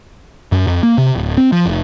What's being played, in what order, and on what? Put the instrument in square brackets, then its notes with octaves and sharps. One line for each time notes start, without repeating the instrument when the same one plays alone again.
[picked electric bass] F#2
F2
A#3
C3
D1
C4
F3
F1